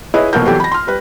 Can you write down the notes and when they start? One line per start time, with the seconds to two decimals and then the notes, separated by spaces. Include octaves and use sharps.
0.14 E4 G#4 B4 C#5 D#5
0.33 F1 B2 F#3 A#3 A#4 G6
0.47 E3 F#3 G3 B3 G4 A4
0.60 B5 A#6
0.71 C6 F6
0.87 G3 B4